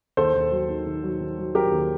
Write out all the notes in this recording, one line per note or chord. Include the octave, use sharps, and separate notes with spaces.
D#2 A4 C5
D#2
F#3
D#3
D#3
F#3
D#3
F#3
F#3 G4 A#4
D#2